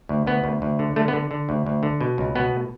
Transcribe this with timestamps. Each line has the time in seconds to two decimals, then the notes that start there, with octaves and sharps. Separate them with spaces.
0.09 D2
0.27 D2 B3
0.44 D2
0.62 D2
0.79 D3
0.96 D3 A3
1.08 B3
1.13 D3
1.31 D3
1.49 D2
1.66 D2
1.83 D3
2.01 B2
2.18 C#2
2.35 B2 B3